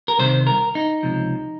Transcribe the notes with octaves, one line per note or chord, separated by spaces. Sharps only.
A#4
C2 C3 D#3 C5
A#4
D#4
C#2 C3 F3